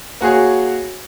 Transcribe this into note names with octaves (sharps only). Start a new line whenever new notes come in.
A#3 F#4 G#4 C#5